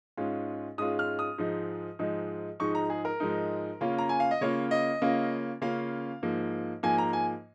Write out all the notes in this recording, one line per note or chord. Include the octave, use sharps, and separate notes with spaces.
G#2 G#3 C#4 F4
G#2 G#3 C#4 F4 D#6
F6
D#6
G#2 F3 G#3 D#4
G#2 F3 G#3 D#4
G#2 F3 G#3 D#4 C#6
A#5
G#4
A#4
G#2 F3 G#3 D#4
C#3 A#3 C#4 F4
A#5
G#5
F5
D#5
C#3 A#3 C#4 F4 C#5
D#5
C#3 A#3 C#4 F4
C#3 A#3 C#4 F4 F5
G#2 F3 A#3
G#2 F3 A#3 G#5
A#5
G#5